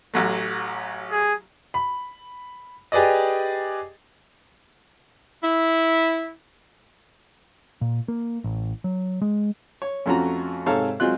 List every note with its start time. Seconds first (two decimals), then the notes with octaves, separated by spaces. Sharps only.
0.14 A1 F#3 A3
1.11 G#4
1.74 B5
2.92 G4 G#4 B4 D5 D#5
5.44 E4
7.81 A#2
8.08 A#3
8.44 A1
8.84 F#3
9.22 G#3
9.82 C#5
10.06 F2 A3 C#4 F4 F#4 A#5
10.66 G#2 C3 A4 C#5 F5 A#5
11.00 F#3 G#3 C4 F4 F#6